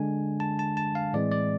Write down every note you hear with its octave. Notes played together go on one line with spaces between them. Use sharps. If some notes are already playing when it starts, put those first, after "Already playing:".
Already playing: D3 G#3 D4 G#5
A5
A5
A5
F5
A2 E3 G#3 C4 D5
D5